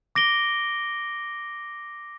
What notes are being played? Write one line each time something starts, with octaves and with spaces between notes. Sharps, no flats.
D6 A#6 D7 G7